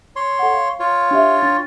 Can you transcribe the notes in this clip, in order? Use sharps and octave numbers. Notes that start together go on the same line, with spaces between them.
C#5 C6
A4 F#5
F5
F4 C#5
D4 G4 E5
D4 A6